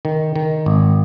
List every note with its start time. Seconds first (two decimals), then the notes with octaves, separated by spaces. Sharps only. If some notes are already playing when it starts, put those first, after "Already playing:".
0.05 D#3
0.36 D#3
0.66 G#1